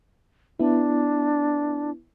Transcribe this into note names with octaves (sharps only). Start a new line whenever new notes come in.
B3 D4 E4